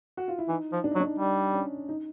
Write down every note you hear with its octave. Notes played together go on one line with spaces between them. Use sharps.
F#4
F4
E4
E3 D#4
F3
D4
D#4
F#3
D4
G3
C#4
D#4